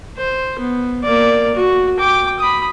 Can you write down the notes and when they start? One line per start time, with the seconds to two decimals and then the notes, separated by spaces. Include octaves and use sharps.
0.17 C5
0.59 B3
1.03 A#3 D5
1.55 F#4
1.99 G5 D6
2.40 B5 D#6